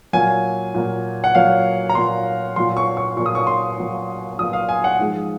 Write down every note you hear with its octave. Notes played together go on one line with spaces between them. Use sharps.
A#2 F#3 A#3 G#5
A#2 F#3 A#3
F#5
A#2 F#3 A#3 F5
A#5
A#2 F#3 A#3 C6
A#2 F#3 A#3 C6
C#6
C#6
A#2 F#3 A#3 C#6
D#6
C#6
C6
A#2 F#3 A#3
A#2 F#3 A#3 D#6
F5
G#5
F#5
G#2 F3 G#3